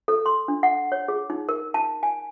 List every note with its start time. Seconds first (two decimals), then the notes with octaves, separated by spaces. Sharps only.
0.08 A4
0.26 C6
0.48 D4
0.63 F#5
0.92 C#5
1.08 G#4
1.30 D#4
1.49 A#4
1.74 A5
2.03 G#5